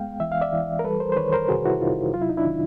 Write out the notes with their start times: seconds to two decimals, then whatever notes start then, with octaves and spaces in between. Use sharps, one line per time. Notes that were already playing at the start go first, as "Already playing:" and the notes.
Already playing: G#3 B3 F5 G5
0.20 E3 E5
0.32 F5
0.41 D5 E5
0.53 E3
0.79 A#4
0.84 G3 A4 B4
1.00 A#4 C5
1.12 C5
1.16 D#3 B4 C#5
1.32 A#4 C5
1.49 C3 F#4 G#4
1.65 E4 F#4
1.81 C3 D#4 F4
2.13 F#3 F4
2.22 E4
2.30 D#4
2.37 D4 E4
2.45 D#3